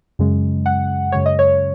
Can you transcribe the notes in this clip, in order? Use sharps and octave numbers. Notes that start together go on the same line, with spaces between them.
F#2 C#3 G#3
F#5
F#2 C#3 G#3 C#5
D#5
C#5